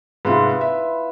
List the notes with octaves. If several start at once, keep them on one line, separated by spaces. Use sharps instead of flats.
G#2 C3 E4 F4 B4
E5